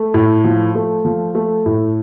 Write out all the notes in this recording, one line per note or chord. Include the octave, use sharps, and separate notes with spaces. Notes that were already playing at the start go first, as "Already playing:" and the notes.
Already playing: A3
A2
F3
A3
F3
A3
A2